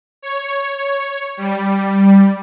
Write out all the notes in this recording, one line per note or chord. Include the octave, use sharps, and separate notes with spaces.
C#5
G3